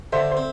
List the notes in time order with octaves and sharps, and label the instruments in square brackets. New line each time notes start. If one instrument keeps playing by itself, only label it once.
[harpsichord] D3 [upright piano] C5 E5
[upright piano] C5
[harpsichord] C4